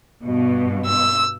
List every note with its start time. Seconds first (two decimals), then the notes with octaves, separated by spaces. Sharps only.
0.22 G2 B2
0.86 E6